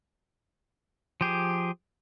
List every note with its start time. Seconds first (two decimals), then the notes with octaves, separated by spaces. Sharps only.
1.21 F3 G4 G#4